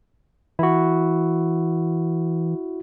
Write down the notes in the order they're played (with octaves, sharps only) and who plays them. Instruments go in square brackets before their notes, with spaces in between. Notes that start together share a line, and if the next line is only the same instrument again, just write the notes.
[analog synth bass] E3 [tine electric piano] E4 F#4